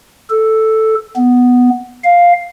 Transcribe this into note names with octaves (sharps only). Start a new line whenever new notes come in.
A4
B3
F5